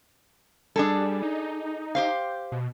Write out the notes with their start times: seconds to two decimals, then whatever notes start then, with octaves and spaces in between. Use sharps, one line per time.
0.76 G3 D4 G#4 A4
1.23 D#4
1.95 G4 C5 F5
2.52 B2